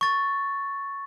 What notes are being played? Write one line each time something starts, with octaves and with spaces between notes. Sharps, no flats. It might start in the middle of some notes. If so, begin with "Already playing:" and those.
C#6 A6